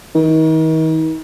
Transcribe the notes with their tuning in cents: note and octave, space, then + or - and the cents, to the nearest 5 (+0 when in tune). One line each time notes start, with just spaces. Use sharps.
D#3 +40